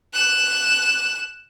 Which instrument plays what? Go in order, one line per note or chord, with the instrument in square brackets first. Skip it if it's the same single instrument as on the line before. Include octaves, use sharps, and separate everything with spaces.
[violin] F#6 E7